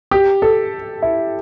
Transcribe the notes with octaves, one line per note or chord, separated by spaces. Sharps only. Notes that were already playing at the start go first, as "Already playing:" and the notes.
G4
A4
E4